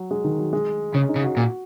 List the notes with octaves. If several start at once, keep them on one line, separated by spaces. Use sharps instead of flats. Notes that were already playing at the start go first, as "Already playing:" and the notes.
Already playing: F#3
G#3
D#3
F#3
G#3
C#3 C#4
D#4
C#3
F#4
A#2